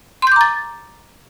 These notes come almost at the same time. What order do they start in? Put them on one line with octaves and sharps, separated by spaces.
C6 G6 D6 A#5 A6